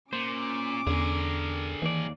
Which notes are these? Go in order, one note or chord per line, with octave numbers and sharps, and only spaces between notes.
A#2 C#4 C5 D6
E2 D3 G#4 A#4
D#2 E3 D5